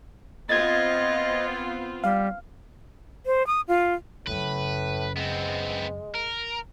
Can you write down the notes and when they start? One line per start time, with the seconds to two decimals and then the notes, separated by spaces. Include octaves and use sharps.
0.49 B3 C4 F4 D#5 G#6 A6
2.04 G3 F5
3.26 C5
3.47 D#6
3.68 F4
4.27 F#2 A2 C#3 B4
5.17 G#3 B3 C4
6.15 A#4